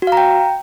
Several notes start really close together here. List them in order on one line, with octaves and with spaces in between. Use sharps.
F#4 F5 A#5 G5